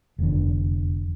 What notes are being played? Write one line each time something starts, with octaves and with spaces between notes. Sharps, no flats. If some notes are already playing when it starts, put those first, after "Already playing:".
F1 E2 D3